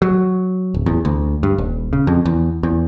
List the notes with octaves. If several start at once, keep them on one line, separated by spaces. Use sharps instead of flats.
F#3
D1
E2
D2
G2
D#1
C#3
F2
E2
E2